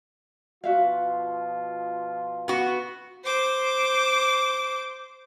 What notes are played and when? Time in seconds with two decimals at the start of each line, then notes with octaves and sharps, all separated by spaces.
0.64 B2 F3 F4 F#4 E5 F5
2.48 B3 F#4
3.24 C5 D6